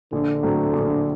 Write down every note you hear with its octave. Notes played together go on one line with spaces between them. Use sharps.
A#1 D3
A2 F#3 A3 C4
A#1